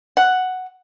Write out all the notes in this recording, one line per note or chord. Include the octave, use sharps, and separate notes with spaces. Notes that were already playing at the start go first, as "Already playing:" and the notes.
F#5